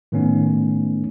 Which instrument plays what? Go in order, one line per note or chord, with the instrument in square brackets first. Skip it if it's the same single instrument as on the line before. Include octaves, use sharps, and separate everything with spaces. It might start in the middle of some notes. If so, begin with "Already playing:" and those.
[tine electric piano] A2 D#3 A3 B3 C#4 D#4